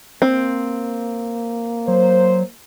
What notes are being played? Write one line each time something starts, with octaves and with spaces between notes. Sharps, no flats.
A#3 C4
F#3 C5